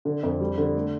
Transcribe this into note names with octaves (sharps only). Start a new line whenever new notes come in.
D3
F2
G3
D3
A3